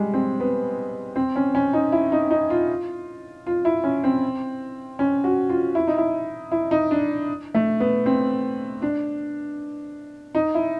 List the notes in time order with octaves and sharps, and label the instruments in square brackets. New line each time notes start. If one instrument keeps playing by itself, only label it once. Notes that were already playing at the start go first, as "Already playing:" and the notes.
Already playing: [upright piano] G3 G#3
C4
B3
C4
C#4
C#4
D#4
E4
D#4
D#4
F4
F4
E4
C#4
C4
C#4
F#4
F4
E4
D#4
E4
E4
D#4
D4
A3
B3
C4
D4
D#4
E4